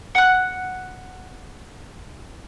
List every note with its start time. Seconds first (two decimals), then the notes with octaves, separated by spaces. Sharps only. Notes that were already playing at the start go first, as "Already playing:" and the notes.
0.15 F#5 F#6